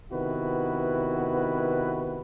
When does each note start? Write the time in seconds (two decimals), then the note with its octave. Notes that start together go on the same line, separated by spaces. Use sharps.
0.12 C3 D#3 B3 E4 F#4 B4